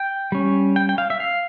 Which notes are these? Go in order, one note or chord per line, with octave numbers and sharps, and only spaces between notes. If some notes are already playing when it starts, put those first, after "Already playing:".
Already playing: G5
G3 C#4
G5
G5
F5
E5
F5